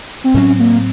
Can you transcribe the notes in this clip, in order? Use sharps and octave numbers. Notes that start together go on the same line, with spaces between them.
C4
A2 F#3 C4 C#4
A#3